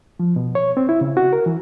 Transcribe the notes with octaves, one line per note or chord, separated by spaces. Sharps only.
F3
B2
C#5
C4
E4
C#3
F#4
A#4
E3